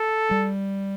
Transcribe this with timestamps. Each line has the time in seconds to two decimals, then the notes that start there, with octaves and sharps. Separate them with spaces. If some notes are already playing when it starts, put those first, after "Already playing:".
Already playing: A4
0.31 G3